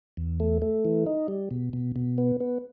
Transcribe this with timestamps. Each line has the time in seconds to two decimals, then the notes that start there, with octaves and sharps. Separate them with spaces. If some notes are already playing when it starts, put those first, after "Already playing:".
0.17 E2
0.40 A3
0.62 A3
0.85 E3
1.06 D#4
1.28 G3
1.51 B2
1.73 B2
1.96 B2
2.18 B3
2.40 B3